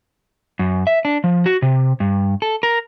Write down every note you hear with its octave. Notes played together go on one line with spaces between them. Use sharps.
F#2
E5
D4
F3
F#4
C3
G2
A4
A#4